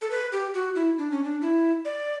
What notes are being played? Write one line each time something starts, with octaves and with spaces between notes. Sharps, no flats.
A4
B4
G4
F#4
E4
D4
C#4
D4
E4
D5